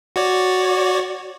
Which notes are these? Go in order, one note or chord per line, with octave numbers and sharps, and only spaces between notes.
F#4 C#5 D5